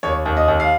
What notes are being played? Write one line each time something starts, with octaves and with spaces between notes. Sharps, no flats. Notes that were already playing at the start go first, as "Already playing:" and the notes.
D#2 C#5
D#2
D#5
D#2
F5